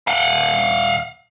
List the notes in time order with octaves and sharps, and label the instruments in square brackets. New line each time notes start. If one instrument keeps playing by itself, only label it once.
[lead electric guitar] F5 F#5